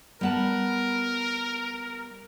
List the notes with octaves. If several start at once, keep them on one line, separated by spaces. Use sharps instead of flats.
G3 B3 A#4 A5